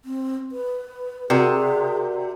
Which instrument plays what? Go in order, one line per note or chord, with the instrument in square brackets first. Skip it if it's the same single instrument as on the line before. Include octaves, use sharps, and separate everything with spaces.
[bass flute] C4
B4
[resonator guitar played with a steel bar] C3 [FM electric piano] F#4 A#4 D5 [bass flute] G#4